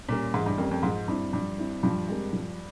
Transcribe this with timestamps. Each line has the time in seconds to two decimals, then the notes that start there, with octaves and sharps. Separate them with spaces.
0.09 A#2 G3 C#4 G4 A#4
0.34 G#2 E3
0.46 G2
0.58 F2 G3 C#4 G4 A#4
0.71 F2
0.83 G#2 F3
1.08 G2 C4 E4
1.33 G2 F3
1.58 C4 E4
1.83 G2 F3
2.08 G#3 C4 G4 A#4
2.33 F3